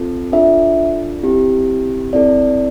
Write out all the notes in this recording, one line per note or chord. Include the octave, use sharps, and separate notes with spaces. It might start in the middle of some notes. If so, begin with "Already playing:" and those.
Already playing: C4 F4 A4
D4 F4 A4 E5
C4 E4 G4
C4 E4 A4 D5